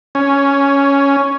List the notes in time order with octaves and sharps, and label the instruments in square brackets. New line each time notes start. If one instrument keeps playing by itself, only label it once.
[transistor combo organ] C#4